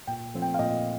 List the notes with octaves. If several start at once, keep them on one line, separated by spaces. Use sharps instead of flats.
A#2 G5
F3 A3 C4
G5
F5
A#2 D#5